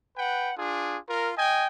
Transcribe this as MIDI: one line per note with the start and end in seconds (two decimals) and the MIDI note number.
0.15 0.51 71
0.15 0.51 78
0.15 0.51 79
0.56 0.96 62
0.56 0.96 65
0.56 0.96 68
1.08 1.30 65
1.08 1.30 70
1.36 1.67 75
1.36 1.67 79
1.36 1.67 80